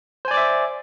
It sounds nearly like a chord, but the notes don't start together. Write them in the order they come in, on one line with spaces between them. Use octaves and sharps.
C5 G#5 D5 D6 E5